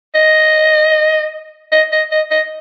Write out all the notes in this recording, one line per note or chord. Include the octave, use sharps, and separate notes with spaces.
D#5
D#5
D#5
D#5
D#5